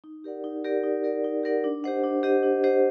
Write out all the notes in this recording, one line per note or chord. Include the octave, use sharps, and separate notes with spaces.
D#4
G4 A#4 D5 F#5
D#4
G4 A#4 D5 F#5
D#4
G4 A#4 D5 F#5
D#4
G4 A#4 D5 F#5
D4
G4 C5 D#5 F#5
D4
G4 C5 D#5 F#5
D4
G4 C5 D#5 F#5